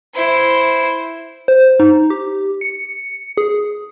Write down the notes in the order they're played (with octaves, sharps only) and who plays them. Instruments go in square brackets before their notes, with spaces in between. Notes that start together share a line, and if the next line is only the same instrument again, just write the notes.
[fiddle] E4 C5
[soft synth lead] C5
D#4
G4
C#7
G#4